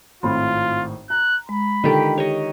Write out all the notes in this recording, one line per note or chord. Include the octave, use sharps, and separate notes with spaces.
G#1 A2 C4 F4 B5 C6
A#5 F#6
G#3 B5
D3 D#3 F4 G4 A4 G5
G4 C#5 D#5